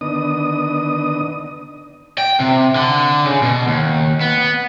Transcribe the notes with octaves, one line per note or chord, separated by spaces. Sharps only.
D3 D#3 B3 D4 D#5 D#6
G5
C3
D3
C#3
B2
D#2
B3